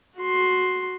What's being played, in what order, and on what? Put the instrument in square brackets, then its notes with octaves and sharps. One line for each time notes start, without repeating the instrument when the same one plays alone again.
[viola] F#4 C6